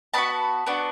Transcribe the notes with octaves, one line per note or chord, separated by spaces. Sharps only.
B3 D4 F#4 A5 B5
B3 D4 F#4